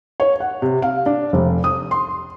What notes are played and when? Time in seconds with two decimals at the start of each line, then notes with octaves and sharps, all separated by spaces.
0.20 C#5
0.40 F#5
0.62 C3
0.82 F5
1.06 D4
1.33 F1
1.64 D#6
1.91 C6